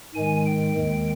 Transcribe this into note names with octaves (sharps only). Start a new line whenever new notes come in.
G#2 D#3 G#3 G#5
G5
D#2 D#3 G#3